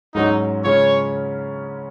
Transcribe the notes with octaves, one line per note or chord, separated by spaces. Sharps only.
G#2 F#3 C#4 D#4
C#3 G#3 C#4 F4 C#5